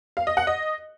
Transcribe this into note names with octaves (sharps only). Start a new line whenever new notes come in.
F5
D#5
F#5
D#5